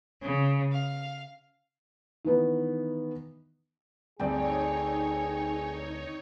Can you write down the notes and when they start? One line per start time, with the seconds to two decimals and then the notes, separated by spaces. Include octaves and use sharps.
0.20 C#3
0.72 F5
2.25 D#3 E3 B3 D#4
4.20 D2 G2 C4 D#4 G#4 C#5 D5 G5